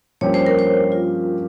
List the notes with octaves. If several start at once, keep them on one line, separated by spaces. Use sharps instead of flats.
G2 F3 A#3 C#4 G4 C#5
C5
A#4
C5
F4